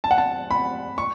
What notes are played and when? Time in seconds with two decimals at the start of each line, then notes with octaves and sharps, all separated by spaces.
0.04 A5
0.11 F#5
0.18 A5
0.51 B5
0.98 C#6